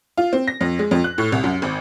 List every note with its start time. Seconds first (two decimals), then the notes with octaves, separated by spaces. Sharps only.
0.17 F4
0.33 C4
0.48 A#6
0.61 F2
0.79 G#3
0.91 F2
1.04 F#6
1.18 A2
1.32 C2
1.44 F#2
1.62 G#1